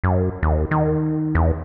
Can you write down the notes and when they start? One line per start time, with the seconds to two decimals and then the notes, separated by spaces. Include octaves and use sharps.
0.04 F#2
0.43 D#2
0.71 D#3
1.35 E2